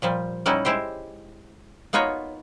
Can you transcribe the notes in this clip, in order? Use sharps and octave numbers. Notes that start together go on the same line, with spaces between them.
A#2 F3 G3
G3 C#4 D#4 E4 F#5
G#3 E4 G4 C5
A#3 B3 D#4 F4 F#4 C#5